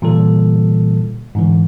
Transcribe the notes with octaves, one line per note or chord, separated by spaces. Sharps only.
A#2 D3 E3 G3 A4
G#2 D3 E3